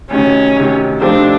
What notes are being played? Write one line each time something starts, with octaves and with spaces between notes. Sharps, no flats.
D2 C3 D#3 C#4
D2 C3 D#3
C3 F3 A3 C4 D4 D#4